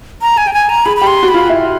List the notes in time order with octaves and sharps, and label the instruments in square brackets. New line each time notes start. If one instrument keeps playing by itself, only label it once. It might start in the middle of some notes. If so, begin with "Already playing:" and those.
[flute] A#5
G#5
G5
G#5
A#5
[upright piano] G#4 [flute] B5
[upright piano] G4 [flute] B5
[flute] C6
[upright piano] F#4
[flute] B5
[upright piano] F4
E4